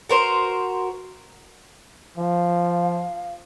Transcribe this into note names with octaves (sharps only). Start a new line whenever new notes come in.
F#4 A#4 C5
F3 F5